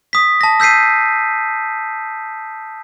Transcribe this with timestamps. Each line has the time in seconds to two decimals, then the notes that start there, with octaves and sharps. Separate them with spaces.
0.13 D#6 B6
0.41 A5 A#6
0.60 E6 G6 B6 C7 D#7